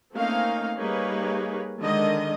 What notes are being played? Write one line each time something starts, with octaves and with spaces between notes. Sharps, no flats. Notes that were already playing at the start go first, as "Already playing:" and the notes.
A3 A#3 C4 C#4 D#4 F5
G3 A#3 D#4 G#4 B4 C#5
D3 D#3 G#3 D#5